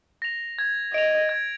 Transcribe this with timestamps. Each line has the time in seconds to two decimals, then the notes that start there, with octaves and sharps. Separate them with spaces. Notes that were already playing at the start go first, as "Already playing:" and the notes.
0.22 A#6 F7
0.59 G#6
0.93 D#5 D7 F7
1.29 G#6